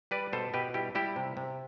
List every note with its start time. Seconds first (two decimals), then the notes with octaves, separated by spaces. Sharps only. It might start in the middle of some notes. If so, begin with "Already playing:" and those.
0.11 G3 B4 D5
0.33 B2 A4 C5
0.54 B2 G4 B4
0.74 G3 E4 G4
0.95 G3 E4 G4
1.16 C3
1.37 C3